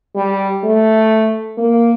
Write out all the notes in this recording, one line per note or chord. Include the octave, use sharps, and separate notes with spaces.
G3
A3
A#3